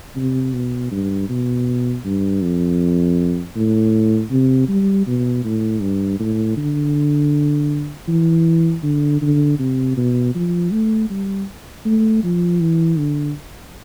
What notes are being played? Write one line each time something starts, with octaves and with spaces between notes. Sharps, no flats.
C3
B2
G2
B2
G2
F2
A2
C3
G3
B2
A2
G2
A2
D3
E3
D3
D3
C3
B2
F3
A3
G3
A3
F3
E3
D3